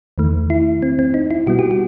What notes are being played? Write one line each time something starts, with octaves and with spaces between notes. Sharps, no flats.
E2 D#3 A3
E4
C4
C4
D#4
E4
B2 G3 B3 F#4
G4
F#4